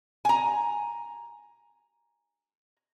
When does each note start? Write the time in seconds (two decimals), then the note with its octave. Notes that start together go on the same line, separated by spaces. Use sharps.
0.25 G#5 A#5